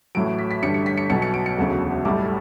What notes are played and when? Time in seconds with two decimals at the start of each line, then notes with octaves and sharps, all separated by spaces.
0.15 A1 A2 F#3 D7
0.39 B6
0.51 B6
0.62 A1 G2 D3 G3 C#7
0.74 C#7
0.86 B6
0.97 C#7
1.10 B1 B2 F#3 C#7
1.22 C#7
1.34 D7
1.46 C#7
1.57 E1 D2 C#3 F#3
2.05 B1 A2 G3 D6